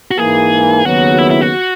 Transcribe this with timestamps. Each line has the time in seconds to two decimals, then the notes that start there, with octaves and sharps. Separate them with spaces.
0.11 F#4
0.17 G#2 E3 A#3 G#4
0.85 D#2 C#3 F#3 B3 F#4
1.18 E4
1.30 E4
1.41 F#4